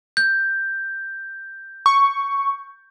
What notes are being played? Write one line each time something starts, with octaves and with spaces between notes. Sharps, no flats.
G6
C#6